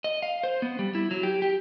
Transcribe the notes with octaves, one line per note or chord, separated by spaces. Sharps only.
D#5
F5
C5
B3
G3
E4
F#3
G4
G4